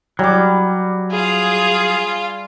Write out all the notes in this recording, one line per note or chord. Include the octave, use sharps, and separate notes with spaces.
F#3 G3 D6
F4 G#4 F5